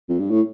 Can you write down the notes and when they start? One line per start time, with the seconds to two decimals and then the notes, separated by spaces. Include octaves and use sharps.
0.09 F2
0.20 G2
0.30 A2